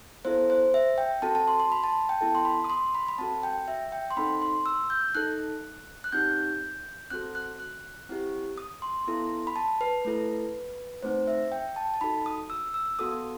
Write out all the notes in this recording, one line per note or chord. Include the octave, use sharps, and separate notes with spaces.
B3 E4 A4 C5
C5
E5
G5
C4 F#4 A4 A5
A5
C6
C6
B5
A5
G5
B3 E4 A4 A5
C6
B5
D#6
C6
B5
B5
C4 F#4 A4 A5
G5
E5
G5
C6
C4 D#4 A4 B5
C6
E6
G6
D#4 A4 F#6
F#6
C4 D#4 G4 G6
C4 F#4 A4 F#6
F#6
F#6
C4 E4 G4
D#6
C6
B3 E4 A4
B5
A5
B4
A3 E4 A4
A3 C4 D#4 C5
E5
G5
A5
A5
D#4 F#4 A4 B5
D#6
E6
E6
B3 F#4 A4 D#6